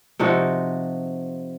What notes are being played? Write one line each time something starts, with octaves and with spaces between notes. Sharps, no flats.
C3 F3 D#4 F#4